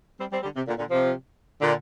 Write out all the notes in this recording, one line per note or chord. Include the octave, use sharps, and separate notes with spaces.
G3 C4
G3 C4
D3 G3
C3
A#2 D3
A#2 D3
C3 F3
A#2 D3